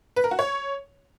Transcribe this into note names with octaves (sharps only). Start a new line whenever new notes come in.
B4
A#4
F#4
C#5